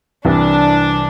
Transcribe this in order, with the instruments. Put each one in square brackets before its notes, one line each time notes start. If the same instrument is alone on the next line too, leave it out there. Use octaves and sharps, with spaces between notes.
[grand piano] C2 C3 E3 [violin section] D4